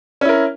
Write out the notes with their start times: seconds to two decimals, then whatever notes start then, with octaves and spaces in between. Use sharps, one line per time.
0.21 C#4
0.25 E4
0.29 A#4